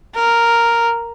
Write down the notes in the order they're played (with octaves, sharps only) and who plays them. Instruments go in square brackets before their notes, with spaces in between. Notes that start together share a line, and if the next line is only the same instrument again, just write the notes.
[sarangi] A#4